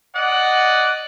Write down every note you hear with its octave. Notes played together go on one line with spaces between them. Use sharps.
D5 D#5 F#5